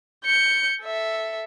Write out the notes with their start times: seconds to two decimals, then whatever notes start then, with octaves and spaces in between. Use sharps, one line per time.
0.25 G6 C#7
0.81 A4 E5